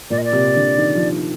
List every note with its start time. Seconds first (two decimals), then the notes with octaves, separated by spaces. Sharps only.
0.10 A#2 D5
0.18 D#5
0.24 D5
0.33 C3
0.56 D3
0.78 D#3
0.95 F3